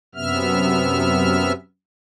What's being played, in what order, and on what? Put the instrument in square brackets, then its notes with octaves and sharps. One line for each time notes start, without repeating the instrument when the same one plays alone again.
[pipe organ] F#2 C3 B3 E5 F6